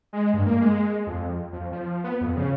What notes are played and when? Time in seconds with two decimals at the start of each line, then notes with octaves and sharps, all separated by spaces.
0.13 G#3
0.34 G2
0.46 A#3
0.61 G#3
1.07 F2
1.52 F2
1.72 F3
2.04 B3
2.21 F2
2.37 C#3